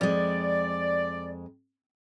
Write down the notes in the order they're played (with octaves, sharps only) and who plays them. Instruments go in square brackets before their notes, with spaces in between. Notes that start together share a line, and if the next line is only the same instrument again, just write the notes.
[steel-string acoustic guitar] F2 G#3 [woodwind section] D5